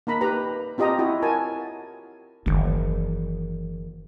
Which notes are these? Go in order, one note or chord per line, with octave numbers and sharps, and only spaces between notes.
A#3 D#4 A#5 B5
G4 B4 A#5
C4 F4 G4 D#5 G5 A#5
E4 F#4
F#4 A#4 G#5 A5
F#1 D#3 E3